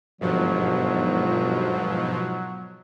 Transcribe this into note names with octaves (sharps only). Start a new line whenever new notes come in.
G1 G#2 B2 F3 F#3